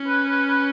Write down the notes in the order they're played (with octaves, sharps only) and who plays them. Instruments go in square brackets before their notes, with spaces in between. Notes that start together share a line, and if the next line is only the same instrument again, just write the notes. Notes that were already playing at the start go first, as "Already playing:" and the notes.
Already playing: [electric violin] C#4
[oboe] B4
B4
B4